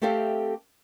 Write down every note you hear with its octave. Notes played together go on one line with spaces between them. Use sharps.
A3 C4 G4 A4 E5 F5